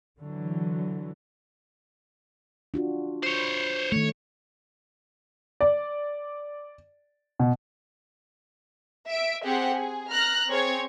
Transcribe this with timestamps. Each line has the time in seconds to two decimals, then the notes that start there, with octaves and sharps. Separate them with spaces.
0.19 D3 E3 F#3
2.74 D4 F4 F#4
3.23 C5 C#5
3.92 D#3 A3 C#5
5.61 D5
7.39 B2
9.10 E5 D7
9.44 C4 G4 G#4 F#5
9.74 G#4
10.13 A#5 F6 F#6 A#6
10.50 C4 G#4 C#5 G#6